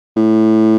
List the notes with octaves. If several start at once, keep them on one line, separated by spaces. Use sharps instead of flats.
A2